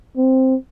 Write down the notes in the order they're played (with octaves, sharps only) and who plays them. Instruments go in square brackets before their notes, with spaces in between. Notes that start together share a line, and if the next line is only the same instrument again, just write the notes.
[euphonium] C4